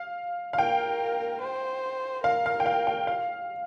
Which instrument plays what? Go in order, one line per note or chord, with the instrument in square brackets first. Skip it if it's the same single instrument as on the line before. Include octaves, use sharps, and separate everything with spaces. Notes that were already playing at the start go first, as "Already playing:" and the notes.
Already playing: [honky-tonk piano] F5
F5
[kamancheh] A#4 [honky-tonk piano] G5
[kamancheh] C5
[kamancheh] A#4 [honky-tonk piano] F5
[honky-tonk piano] F5
G5
F5
G5
F5